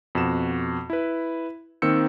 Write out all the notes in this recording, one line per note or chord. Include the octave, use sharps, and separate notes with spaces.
F2 B2 F#4 E7
E4 B4
D#3 A#3 C4 E6 G6 C#7